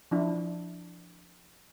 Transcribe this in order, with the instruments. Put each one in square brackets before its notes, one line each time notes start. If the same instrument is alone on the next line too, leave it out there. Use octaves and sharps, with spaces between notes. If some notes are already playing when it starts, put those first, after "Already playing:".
[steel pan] F3 D4 E4